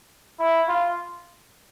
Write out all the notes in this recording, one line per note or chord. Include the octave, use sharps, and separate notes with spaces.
E4
F4